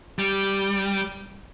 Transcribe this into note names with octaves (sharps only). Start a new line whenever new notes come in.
G3